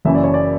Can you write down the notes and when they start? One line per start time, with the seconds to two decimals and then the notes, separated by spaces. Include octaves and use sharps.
0.05 F#1 F#2 E3 E5
0.15 D5
0.24 C#5
0.34 D5